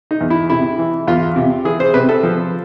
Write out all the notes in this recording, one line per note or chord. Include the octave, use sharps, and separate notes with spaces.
D#4
E2
E4
C3 E4
E3
E2 F4
C3
E3 G#4
C5
C3 B4
A4
F3